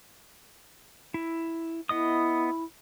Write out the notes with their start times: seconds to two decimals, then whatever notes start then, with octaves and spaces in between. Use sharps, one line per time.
1.14 E4
1.89 B3 E4 D#5 D#6